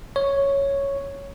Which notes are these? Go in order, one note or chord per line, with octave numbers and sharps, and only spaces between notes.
C#5